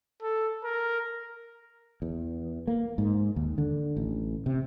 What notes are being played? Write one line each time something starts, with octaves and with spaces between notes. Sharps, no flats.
A4
A#4
E2
A#3
G#2
D#2
D3
A1
C3